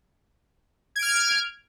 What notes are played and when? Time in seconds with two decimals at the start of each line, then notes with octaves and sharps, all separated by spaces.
0.96 G#6
0.99 D7
1.02 F6